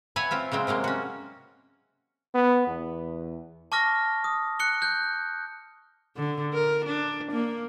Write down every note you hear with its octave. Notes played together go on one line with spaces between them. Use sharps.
B4 C#5 E5 F#5 G#5
C4 F4 E5
C#3 F#3 G#3 C4
C3 F#3 G#3 A#3
C#4 F#4
B3
E2
A5 C#6 D6 F6 A#6
D#6
F#6 C#7 G7
F#6 G6
D3
A#4
D4
A#3